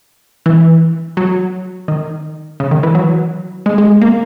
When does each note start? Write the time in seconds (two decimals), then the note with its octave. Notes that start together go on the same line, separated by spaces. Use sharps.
0.46 E3
1.17 F#3
1.88 D#3
2.60 C#3
2.71 D#3
2.83 E3
2.95 F#3
3.66 G#3
3.78 G#3
4.02 A#3